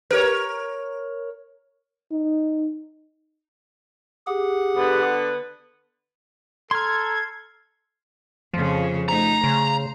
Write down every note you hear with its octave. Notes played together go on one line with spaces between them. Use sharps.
G4 A#4 B4 C#5
D#4
G4 G#4 F#5
D3 B3
A4 A#5 C6 F6 G#6
F2 C#3 F3
A3 D#4 A#5
C#3 C5